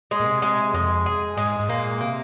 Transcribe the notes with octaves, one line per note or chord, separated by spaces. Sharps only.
G#3
A#2
C3
G#3
F2 G#3
G#4
G#2 G#3
G#2
A#2 A#3
C3 A#3